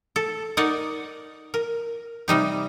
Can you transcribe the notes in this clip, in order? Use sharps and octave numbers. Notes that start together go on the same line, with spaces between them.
A4
D#4 A#4 D5 F#5
A#4
C3 G3 D#4 G4